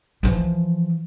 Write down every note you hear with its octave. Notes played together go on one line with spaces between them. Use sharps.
E3 F3